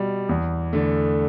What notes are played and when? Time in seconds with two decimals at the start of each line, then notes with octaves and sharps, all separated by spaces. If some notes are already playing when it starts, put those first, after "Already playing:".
Already playing: B2 G3
0.29 E2
0.73 D3 A3